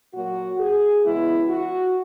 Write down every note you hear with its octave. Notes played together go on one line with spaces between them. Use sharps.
A#2 F#3 A#3 F#4
G#4
E2 C#3 G#3 B3 E4
F#4